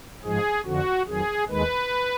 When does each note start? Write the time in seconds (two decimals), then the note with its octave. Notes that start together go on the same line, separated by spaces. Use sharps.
0.24 G#2 F3 G#3 G#4
0.65 F2 D3 F3 F#4
1.07 F2 D#3 F#3 G#4
1.48 D#2 D#3 G#3 B4